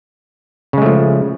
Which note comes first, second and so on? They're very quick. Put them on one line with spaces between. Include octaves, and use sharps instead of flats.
C#3 G#3 A3 F3